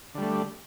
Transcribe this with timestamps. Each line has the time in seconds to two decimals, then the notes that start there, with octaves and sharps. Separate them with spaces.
0.15 D3
0.18 G3
0.21 A3